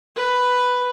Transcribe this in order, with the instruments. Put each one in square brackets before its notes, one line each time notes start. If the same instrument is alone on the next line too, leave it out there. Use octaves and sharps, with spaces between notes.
[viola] B4